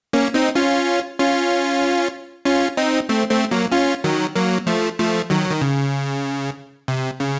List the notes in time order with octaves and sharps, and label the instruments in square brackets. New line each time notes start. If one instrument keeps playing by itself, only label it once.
[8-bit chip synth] A#3 C#4
C4 D#4
C#4 F4
C#4 F4
C#4 F4
C4 D#4
A3 C4
A3 C4
F#3 A#3
C#4 F4
D#3 F#3
F#3 A#3
F3 A3
F3 A3
D#3 F#3
D#3
C#3
C3
C#3